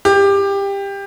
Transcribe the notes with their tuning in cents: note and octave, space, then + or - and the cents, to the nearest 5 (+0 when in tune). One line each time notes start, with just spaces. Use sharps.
G4 +20